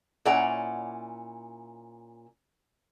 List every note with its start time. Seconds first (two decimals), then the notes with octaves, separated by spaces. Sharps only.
0.25 A#2 C#4 E4 D5 F#5 A#5